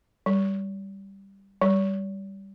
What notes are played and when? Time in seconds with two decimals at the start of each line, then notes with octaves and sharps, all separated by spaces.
0.26 G3
1.61 G3